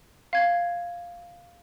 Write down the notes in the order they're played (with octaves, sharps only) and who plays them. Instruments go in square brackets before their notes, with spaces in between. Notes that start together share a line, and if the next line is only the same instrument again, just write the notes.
[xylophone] F5 G#6